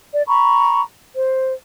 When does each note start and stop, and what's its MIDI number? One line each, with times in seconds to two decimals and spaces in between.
0.13 0.22 74
0.28 0.82 82
0.28 0.82 83
0.28 0.82 85
1.16 1.52 72